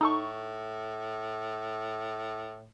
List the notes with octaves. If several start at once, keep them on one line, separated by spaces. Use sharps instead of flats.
A2 D#4 A4 C#6